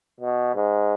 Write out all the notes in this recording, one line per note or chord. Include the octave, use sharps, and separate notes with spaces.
B2
G#2